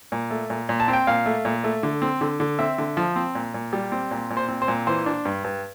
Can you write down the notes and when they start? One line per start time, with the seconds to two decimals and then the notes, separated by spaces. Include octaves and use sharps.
0.12 A#2
0.31 A3
0.50 A#2
0.69 A#2
0.80 A5
0.88 C4
0.93 G5
1.07 A#2 F5
1.26 A3
1.45 A#2
1.64 A3
1.83 D3
2.02 C4
2.21 D3
2.40 D3
2.59 C4 E5
2.78 D3
2.97 F3
3.16 C4
3.35 A#2
3.54 A#2
3.73 G3
3.92 C4
4.11 A#2
4.30 A#2
4.37 C5
4.49 C4
4.62 C5
4.68 A#2
4.87 E3 C5
5.06 D4
5.25 G2
5.44 G2